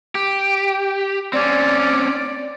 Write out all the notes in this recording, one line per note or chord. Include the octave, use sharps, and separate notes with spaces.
G4
C4 C#4 D5